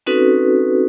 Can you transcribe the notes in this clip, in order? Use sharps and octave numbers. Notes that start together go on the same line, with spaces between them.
C4 C#4 D#4 F#4 A4 B4